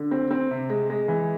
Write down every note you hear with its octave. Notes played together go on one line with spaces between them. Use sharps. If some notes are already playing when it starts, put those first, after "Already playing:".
Already playing: D3
C4
C4
C3
G#3
G#3
E3